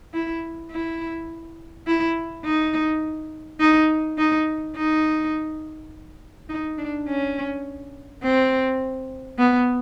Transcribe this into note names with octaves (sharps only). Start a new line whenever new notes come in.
E4
E4
E4
D#4
D#4
D#4
D#4
D#4
D4
C#4
C4
B3